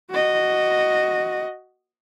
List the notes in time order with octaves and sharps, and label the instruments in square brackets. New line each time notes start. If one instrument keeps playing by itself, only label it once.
[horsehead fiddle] F#4 D#5